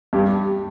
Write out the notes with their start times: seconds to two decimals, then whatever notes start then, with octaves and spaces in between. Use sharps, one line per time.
0.13 G2 G4